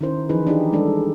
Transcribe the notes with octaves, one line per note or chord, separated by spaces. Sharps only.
D#3 C#4 E4 A#4 C5
E3 F3 D#4 G#4 B4
D4 D#4 G4 G#4
G3 G#3 D4 D#4 A4